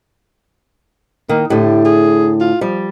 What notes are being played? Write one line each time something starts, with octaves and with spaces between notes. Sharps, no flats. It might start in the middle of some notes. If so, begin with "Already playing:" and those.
D#3 A#3
A2 D3 G4
G#4
F4
F3 G3